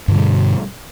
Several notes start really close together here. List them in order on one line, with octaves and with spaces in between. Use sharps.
G2 D3 G3 B2